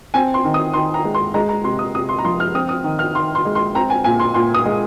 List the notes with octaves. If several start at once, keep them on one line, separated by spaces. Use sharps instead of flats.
C4 G#5
C6
D#3
D#6
D#3 C6
A#5
G#3
C6
G#3 A#5
A#5
C3 C6
D#6
C3 D#6
C6
A#5
F3 C6
F6
C4 D#6
D#6
D#3
F6
D#3 C6
C6
G#3
C6
C4 A#5
G#5
A#2 G#5
C6
A#2 C6
D#6
G#3